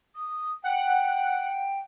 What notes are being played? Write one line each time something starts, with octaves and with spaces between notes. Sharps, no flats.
D#6
F#5 G5